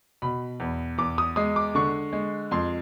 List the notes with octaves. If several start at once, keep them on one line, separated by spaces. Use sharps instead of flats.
B2 B5
E2
E2 D6
D#6
G#3 D#6
D6
D3 C#6
G#3
F2 C6